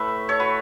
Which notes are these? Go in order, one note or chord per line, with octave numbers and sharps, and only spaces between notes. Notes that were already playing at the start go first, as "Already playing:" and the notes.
Already playing: A2 A3 B4 E5
A4 C#5
F#4 B4